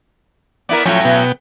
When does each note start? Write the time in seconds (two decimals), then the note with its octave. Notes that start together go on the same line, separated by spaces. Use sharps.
0.69 B3 E4 A#4 D5
0.86 A2 F3 F#3 C#4 C#5 G5
1.05 B2 B3 G5